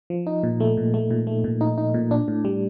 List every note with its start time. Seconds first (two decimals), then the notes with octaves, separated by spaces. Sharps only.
0.10 F3
0.26 D#4
0.43 A#2
0.60 A3
0.77 A#2
0.94 A3
1.11 A#2
1.27 A3
1.44 A#2
1.61 D#4
1.78 D#4
1.94 A#2
2.11 D4
2.28 A2
2.45 G3